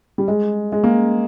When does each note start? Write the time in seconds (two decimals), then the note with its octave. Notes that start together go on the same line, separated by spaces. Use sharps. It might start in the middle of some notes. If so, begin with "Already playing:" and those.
0.18 G3
0.28 G#3
0.72 G#3
0.84 A#3